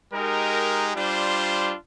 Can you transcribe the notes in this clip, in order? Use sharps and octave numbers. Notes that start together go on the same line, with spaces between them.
G#3 D#4 G4 A#4
G3 D4 F4 C5